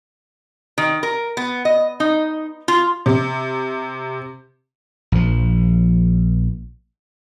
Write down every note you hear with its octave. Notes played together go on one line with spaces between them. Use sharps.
D#3
A#4
B3
D#5
D#4
F4
C3
A#1 F3